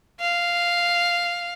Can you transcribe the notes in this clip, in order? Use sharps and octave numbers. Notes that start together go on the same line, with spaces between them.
F5